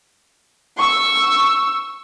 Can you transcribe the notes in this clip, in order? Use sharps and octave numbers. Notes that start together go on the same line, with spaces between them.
C#6 E6